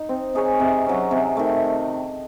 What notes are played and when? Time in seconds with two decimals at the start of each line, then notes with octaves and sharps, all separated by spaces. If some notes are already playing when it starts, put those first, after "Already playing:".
Already playing: D#4
0.09 C4
0.35 D#4 G#4 C#5
0.60 C3
0.86 F#3 C#4
1.11 C3
1.37 D#3 A3